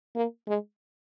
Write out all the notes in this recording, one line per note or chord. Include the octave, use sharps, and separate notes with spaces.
A#3
G#3